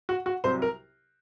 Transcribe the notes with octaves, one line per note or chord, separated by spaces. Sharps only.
F#4
F#4
C2 C3 F#3 C5
A#4